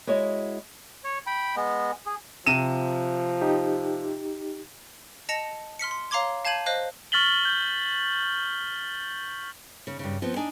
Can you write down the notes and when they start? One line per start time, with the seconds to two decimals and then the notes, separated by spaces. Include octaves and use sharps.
0.07 G#3 E4 F#4 C#5 D#5
1.04 C#5
1.27 G5 B5
1.56 G#3 B3
2.06 G#4
2.46 C3 F3 D#7 E7
3.41 D#4 G4
5.29 D#5 A5 A#6 C#7 F7
5.79 C6 F6 B6 C#7
5.91 C6
6.11 C#5 F5 A#5 C6 D6 G#6
6.45 F5 A5 G6 G#6 D#7 F#7
6.66 C5 D#5 F5 F#6
7.12 C#6 F6 A6 B6 F#7 G7
7.45 G6
9.87 C#3
9.99 G2 C#3
10.22 F3 B3 C4
10.36 D4 D#4 G#5